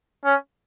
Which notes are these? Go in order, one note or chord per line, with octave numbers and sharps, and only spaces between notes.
C#4